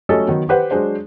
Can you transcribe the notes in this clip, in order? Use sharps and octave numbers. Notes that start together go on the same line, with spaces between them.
F#3 G3 A3 C#4 A4 D#5
D#3 F#3 B3
G4 B4 C5 F#5
F#3 G#3 D4 C5